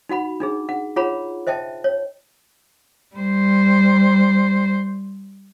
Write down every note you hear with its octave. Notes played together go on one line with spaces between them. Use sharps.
D#4 F#4 F#5 B5
D4 D#4 G#4
F#5
F4 G#4 C#5 F#5 A#5 B5
C5 D#5 E5 G5 A5
C#5
G3 C5